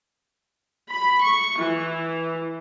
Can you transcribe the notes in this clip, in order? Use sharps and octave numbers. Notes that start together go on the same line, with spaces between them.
B5
C#6
E3